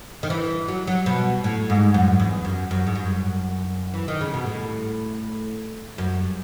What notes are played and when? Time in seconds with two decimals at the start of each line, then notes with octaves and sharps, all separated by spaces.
0.23 D#3
0.30 E3
0.68 F#3
0.87 F#3
1.06 B2
1.44 A2
1.70 G#2
1.94 F#2
2.20 E2
2.45 F#2
2.71 F#2
2.87 G#2
2.95 F#2
3.94 E3
4.08 D#3
4.21 C#3
4.34 B2
4.46 A2
5.98 F#2